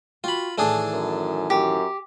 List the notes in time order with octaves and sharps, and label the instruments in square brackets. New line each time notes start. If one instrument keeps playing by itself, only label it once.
[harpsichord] F4 B5 [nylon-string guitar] F#4 G5
[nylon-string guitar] A2 D#3 E3 [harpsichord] A3 D4 G#4
[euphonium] F#2
[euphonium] F#2 [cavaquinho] G4